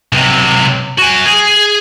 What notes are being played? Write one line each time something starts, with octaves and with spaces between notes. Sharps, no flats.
B1 C3
F#4 G#5
G#4